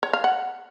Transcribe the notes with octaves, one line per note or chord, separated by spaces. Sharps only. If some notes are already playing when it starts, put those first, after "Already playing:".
C#5
F5
F#5